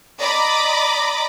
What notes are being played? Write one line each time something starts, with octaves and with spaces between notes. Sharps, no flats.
D5 D#5 A#5 B5 D6